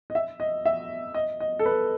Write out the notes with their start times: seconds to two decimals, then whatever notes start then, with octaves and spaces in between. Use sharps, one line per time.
0.10 D#5
0.15 E5
0.40 D#5
0.65 E5
1.14 D#5
1.40 D#5
1.59 A4
1.66 B4